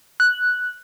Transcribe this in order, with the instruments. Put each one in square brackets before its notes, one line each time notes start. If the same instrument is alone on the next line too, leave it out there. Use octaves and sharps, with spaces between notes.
[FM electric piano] F#6